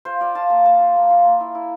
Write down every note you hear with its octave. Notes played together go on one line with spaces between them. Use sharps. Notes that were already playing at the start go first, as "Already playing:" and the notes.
F4 C5
F4 D5
F4 A5
A#3 A5
A#3 A5
F4
A#3
F4
A#3
E4
E4